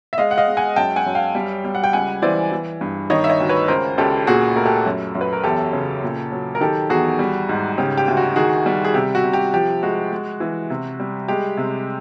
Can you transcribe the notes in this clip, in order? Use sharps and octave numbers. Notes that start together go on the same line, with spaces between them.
E5
G#3 D#5 F5
F#5
D#5 F5
G#3
F#5 G#5
F#2 G5 A5
F#5 G#5
F#2
F5 G5
G3
G3
F#5
G5
C#2 F#5 G#5
E3 C5 D5
E3
G2
D#3 C#5 D#5
E5
C#5 D#5
D2
B4 C#5
C#2 A#4 C5
C#2 G4 A4
A#2 F#4 G#4
A3 A#4
G4 A4
F#2
F#2
B4
A#4
E2 G4 A4
C#3
A#2
F#3
A#4
D#3 G4 A4
E2 F#4 G#4
G3
G#2
C#3 G4
G4
D2
F#4
D#3 F#4 G#4
G3
G#4
C3 G4
F#4
C3
G4
F3 G4
G#3 F#4
G#3
E3
C3
G3
G#3 G4
C3